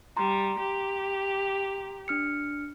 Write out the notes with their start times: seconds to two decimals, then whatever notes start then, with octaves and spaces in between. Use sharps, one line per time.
0.17 G3 A#5 C6
0.59 G4
2.08 D4 F6 C#7